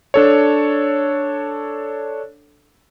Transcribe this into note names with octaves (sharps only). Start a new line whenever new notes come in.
D4 A4 C#5